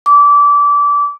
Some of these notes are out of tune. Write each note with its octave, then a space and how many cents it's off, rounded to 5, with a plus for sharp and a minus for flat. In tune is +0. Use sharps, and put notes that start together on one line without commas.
D6 -25